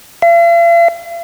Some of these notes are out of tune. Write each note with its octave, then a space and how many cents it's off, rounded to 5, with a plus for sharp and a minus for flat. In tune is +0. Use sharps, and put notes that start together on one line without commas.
F5 -45